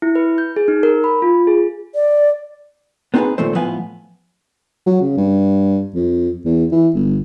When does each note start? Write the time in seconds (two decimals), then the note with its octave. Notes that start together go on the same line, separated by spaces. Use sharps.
0.02 E4
0.15 B4
0.38 G6
0.56 G#4
0.68 D#4
0.83 A#4
1.04 B5
1.22 F4
1.47 G#4
1.95 D5
3.14 B3 C4 D#4 F#4 G#4 B4
3.38 D#2 A#2 F3 A3 C4 C5
3.55 A2 F3 B3 B4 F5 G#5
4.86 F#3
5.01 C#3
5.17 G2
5.95 F2
6.45 E2
6.72 E3
6.95 G1